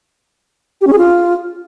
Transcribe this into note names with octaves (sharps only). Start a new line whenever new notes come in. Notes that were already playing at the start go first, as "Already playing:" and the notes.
G4
C#4
G#4
F4